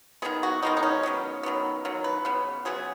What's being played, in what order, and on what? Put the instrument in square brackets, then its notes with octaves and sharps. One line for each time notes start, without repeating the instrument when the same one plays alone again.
[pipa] D#3 F#3 B3 G#4
F#4
D#3 G#3 B3 D#4
D#4
C#4
D#3 F#3 B3
D#3 F#3 B3
D#3 F#3
B4
C#3 B3
C#3 F#3 B3 G#4